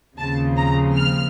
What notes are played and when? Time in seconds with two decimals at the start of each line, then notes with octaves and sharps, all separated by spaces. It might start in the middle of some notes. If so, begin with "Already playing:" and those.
0.17 D#2 C#3 F3 C4 A5
0.57 A#5
0.96 F6